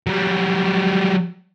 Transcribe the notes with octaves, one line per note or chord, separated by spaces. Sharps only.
F#3 G3